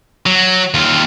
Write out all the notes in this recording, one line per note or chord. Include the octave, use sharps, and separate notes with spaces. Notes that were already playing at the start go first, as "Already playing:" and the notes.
F#3
D#2 F4